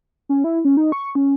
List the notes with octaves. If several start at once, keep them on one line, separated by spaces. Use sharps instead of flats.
C#4
E4
C#4
D#4
C#6
C#4